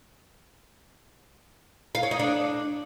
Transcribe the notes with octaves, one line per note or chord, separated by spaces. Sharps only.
F5
C#5
D#4
D4